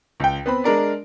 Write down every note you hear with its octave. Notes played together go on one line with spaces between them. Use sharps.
C#2 G5
B3 C4 B5
G#3 D4 A#4 D5